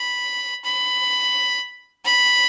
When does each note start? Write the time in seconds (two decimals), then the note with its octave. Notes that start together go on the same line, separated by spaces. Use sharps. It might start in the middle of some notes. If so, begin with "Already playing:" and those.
Already playing: B5
0.64 B5
2.05 B5